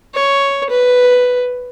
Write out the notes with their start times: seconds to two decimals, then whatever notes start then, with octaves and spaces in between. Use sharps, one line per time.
0.14 C#5
0.70 B4